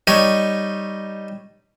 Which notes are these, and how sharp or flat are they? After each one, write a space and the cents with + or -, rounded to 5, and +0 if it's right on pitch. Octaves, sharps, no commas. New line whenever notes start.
G3 +0 D#4 +0 C#5 +0